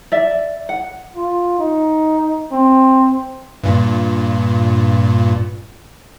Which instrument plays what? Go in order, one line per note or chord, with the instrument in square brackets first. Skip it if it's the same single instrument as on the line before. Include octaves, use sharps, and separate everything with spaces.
[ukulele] D5 E5
F#5
[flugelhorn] F4
D#4
C4
[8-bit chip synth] G2 A#2